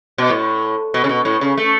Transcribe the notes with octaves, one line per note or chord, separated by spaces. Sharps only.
B2
A2
B2
C#3
B2
A2
C#3
A3